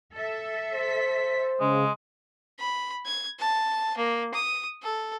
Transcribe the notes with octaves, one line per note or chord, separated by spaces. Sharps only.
A4 E5
C5 B6
C#3 G#3
B5
G#6
A5
A#3
D#6
A4